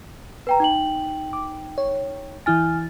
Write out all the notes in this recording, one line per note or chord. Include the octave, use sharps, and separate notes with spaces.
B4 G5 A#5
D#4 G5 F#7
D6
C#5
E3 E4 G#5 F6 A6